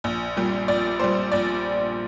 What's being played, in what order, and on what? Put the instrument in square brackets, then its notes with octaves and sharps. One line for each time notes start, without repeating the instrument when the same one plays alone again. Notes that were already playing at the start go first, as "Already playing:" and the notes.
[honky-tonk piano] A#1
A#2 G3
A#1 D5
A#2 G3 C5
A#1 D5